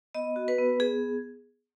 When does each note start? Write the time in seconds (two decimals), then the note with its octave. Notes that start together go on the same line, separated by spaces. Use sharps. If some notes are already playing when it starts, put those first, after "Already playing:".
0.15 B3 D#5
0.36 F#4
0.48 B4
0.58 B3
0.80 B3 G#4